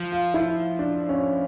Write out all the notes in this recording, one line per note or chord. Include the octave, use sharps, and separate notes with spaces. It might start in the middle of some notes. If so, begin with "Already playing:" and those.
Already playing: F3
F4
E4
D4
C#4